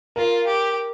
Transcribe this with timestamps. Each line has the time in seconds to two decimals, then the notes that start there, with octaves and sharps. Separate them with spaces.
0.16 F4 A#4
0.47 G4